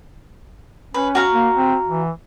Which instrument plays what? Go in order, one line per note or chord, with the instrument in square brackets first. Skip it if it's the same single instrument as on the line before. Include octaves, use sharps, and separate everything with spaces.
[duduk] C#4 [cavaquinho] B4
[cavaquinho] F#4 F5 A#5
[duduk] A#3
C4
E3